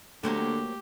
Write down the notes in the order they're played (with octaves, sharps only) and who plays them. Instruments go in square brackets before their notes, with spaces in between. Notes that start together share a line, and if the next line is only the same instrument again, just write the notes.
[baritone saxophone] D3 [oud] F#3 A#3 C5 [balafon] A3 [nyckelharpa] G4